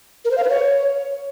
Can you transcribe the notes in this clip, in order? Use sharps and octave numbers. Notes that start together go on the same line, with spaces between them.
A#4
C5
F5
B4
C#5